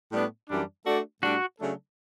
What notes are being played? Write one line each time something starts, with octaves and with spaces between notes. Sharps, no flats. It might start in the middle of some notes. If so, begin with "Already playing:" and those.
A2 G3 B3 D4
F#2 E3 G3 D4
A3 D4 F#4 A4 D5
A2 G3 D4 F#4
C#3 F#3 A3 D4 A4